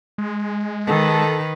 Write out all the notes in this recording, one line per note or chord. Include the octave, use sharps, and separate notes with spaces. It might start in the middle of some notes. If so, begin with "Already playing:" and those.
G#3
D#3 A4 B4